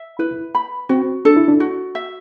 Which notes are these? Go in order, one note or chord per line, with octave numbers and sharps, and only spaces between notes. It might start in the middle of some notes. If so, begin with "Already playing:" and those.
Already playing: E5
E4 B4
B5
C4 F#4
D4 A4
E4
D4
F#4
E5